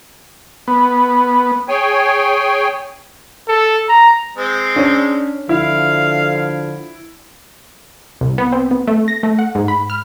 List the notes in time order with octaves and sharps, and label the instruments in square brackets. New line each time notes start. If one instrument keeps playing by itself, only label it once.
[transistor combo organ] B3
[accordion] G#4 C#5 G5 G#5
[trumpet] A4
A#5
[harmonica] G#3 C4
[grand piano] C#4 [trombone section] D4
[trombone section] D3 F3 [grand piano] E4 [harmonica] F5
[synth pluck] C2
B3
C4
B3
A3
A#6
A3
F#5
G#2
B5
F6